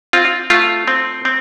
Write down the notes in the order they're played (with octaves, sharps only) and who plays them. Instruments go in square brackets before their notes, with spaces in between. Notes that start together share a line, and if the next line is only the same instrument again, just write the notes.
[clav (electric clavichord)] C4 F4
A3 F4
C4
C4